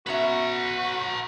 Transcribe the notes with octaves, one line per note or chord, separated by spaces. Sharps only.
B3 C#4 F#4 B4 E5 A#5